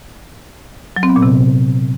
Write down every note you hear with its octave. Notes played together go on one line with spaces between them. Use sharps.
F#3
C4
B3
A#2
C3